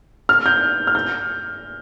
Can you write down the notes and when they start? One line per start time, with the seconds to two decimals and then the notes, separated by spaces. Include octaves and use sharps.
0.29 F6
0.46 G6
0.87 F6
0.95 G6